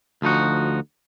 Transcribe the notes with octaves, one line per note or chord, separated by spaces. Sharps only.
D2 F3 D#4 F#4